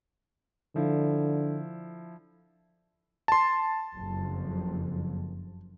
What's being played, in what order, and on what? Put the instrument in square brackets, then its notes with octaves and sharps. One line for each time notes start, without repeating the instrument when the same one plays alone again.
[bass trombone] D3 [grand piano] F3 E4
[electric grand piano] A5 C6
[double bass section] F#1 F2